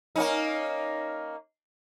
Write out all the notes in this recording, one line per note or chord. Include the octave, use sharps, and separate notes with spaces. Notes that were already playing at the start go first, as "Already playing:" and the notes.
A#3 C#4 D#4